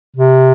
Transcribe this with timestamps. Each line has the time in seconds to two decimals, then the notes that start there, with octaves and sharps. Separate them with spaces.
0.16 C3